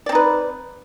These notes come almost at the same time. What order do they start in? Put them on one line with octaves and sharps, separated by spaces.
D5 C4 D#4 B4